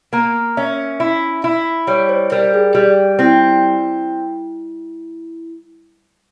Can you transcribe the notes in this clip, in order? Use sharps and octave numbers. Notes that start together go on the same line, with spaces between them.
A#3 A#5
C#4 E5
E4
E4
G3 C#5
C5
G3 A#4
G#4
G3 G4
C4 E4